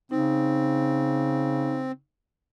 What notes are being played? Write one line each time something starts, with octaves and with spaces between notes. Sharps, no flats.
C#3 C4 D#4